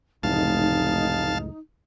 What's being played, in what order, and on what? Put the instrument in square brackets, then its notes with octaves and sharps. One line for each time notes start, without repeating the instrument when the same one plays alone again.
[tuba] F1 [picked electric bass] C#2 F#2 A2 [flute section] D#4 [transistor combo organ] F5 A5